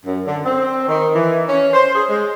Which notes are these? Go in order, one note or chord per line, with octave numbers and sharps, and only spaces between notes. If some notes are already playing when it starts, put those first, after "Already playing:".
F#2
D3
C4
D#3
E3
C#4
C5
G#4
G#3